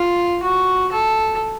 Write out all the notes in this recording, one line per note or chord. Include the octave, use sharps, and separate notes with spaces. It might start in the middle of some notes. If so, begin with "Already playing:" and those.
Already playing: F4
F#4
A4